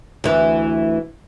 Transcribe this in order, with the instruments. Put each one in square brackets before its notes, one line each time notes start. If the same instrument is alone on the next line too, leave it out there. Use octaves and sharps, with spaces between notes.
[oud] D2 E3